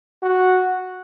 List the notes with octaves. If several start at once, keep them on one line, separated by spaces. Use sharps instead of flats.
F#4